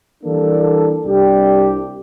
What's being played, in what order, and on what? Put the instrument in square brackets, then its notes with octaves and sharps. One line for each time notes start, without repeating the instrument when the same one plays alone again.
[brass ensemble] E3 G3 A#3 D4 A4
C2 C3 G3 D4 G4